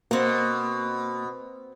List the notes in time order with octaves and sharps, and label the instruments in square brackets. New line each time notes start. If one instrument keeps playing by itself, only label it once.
[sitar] B2 [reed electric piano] A#3 [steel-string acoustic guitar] C4 F#5